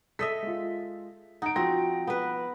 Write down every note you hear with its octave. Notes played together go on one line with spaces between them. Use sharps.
A4 D#5 E5 B6
G#3 F4
D#4 F#5 D7
F3 C4 F#4 A#6
B3 B4